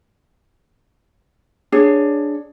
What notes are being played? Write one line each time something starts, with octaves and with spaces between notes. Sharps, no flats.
D4 G#4 C#5